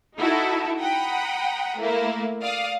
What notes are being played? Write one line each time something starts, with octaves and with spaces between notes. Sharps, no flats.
D#4 E4 F#4 A4
F#5 G5 A#5 B5 D#6
A3 A#3 E4
D5 F5 D#6